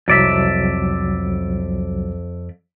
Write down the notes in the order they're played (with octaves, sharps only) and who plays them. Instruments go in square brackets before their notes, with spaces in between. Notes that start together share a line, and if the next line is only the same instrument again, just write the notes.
[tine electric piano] C2 F#3 [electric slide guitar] F2 D5 E5